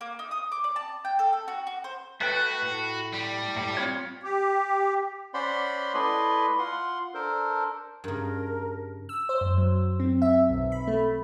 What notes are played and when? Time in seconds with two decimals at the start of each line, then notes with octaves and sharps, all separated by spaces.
0.01 A#3
0.19 D#4
0.31 D#6
0.52 D6
0.64 D5
0.76 A5
1.05 G5
1.19 A4
1.33 A4
1.48 F#4
1.67 F#4
1.84 C5
2.21 A3 F#4 B4 G5
2.62 A2
3.13 G3
3.56 A2
3.77 C4 F4 C#5
4.23 G4
5.34 C#4 C5 D5 F#5 B5 C6
5.94 A3 E4 B4 D5 D#5 C6
6.59 F4 F#5 C6
7.14 D4 A4 A#4 C5
8.04 G2 C#3 A#4
9.09 E6
9.29 C5
9.41 F#2
9.58 F#3
10.00 C4
10.22 E5
10.50 B1
10.72 B5
10.87 A3